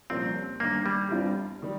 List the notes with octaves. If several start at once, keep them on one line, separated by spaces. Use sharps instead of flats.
C2 A#2 F3 A#3 C4 C#4
G1 G2 D#3 A#3
G3
G1 G2 G3 C4 F4
D#3 G3